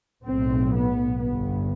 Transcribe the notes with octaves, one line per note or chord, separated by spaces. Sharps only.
B1 A2 C4
B3
G1 G2 B3